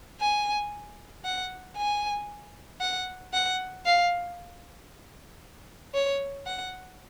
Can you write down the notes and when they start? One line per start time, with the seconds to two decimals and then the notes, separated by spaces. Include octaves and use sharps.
0.20 G#5
1.25 F#5
1.77 G#5
2.81 F#5
3.33 F#5
3.85 F5
5.94 C#5
6.46 F#5